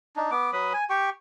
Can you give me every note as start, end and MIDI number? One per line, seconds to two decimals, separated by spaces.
0.16 0.31 62
0.16 0.31 63
0.31 0.51 59
0.31 0.51 86
0.53 0.73 54
0.53 0.73 71
0.53 0.73 83
0.53 0.73 87
0.74 0.84 80
0.90 1.10 67
0.90 1.10 79
0.90 1.10 85